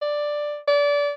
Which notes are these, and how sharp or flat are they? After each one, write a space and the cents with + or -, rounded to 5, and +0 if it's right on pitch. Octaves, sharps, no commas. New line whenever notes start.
D5 +5
D5 -25